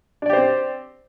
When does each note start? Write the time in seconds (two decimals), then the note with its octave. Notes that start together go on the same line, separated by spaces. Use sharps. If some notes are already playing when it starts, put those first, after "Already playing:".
0.22 D4
0.26 D5
0.29 G4
0.33 C5
0.37 C4